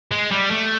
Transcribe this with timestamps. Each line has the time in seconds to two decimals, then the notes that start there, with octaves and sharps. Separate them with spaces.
0.11 G#3
0.31 G3
0.51 A3